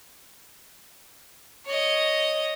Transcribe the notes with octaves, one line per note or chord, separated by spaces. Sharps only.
C#5 D#5